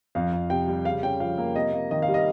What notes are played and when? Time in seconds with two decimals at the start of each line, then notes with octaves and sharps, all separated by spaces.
0.15 F2 F5
0.33 F2
0.50 C3 G5
0.68 G3
0.85 C#3 F5
1.03 C#4 G5
1.20 F3 F5
1.38 A#3
1.55 C3 D#5
1.73 A#3
1.91 D#3 D#5
2.02 F5
2.08 G3
2.14 D#5